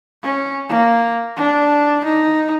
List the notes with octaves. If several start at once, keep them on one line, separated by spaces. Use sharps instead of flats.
C#4
A#3
D4
D#4